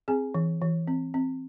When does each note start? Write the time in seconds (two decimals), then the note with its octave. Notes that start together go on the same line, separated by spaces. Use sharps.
0.08 C4 G#4 G#5
0.35 E3
0.61 E3
0.88 C4
1.14 C4